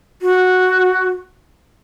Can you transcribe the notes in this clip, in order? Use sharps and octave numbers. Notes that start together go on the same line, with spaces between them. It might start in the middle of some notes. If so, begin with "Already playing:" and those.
F#4